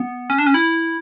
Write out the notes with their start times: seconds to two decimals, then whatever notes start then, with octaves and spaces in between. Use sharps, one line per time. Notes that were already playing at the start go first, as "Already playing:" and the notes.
Already playing: B3
0.30 C#4
0.38 D4
0.46 C#4
0.54 E4